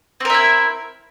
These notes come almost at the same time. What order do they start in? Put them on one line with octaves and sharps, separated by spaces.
C4 A#4 E5 E4